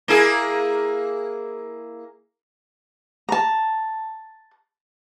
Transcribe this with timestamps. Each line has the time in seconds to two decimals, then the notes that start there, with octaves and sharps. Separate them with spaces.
0.08 A#3 E4 G#4
3.29 A5 A#5